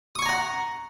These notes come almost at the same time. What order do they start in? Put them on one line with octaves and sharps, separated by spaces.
D#6 C#6 G#5 A#5 F#5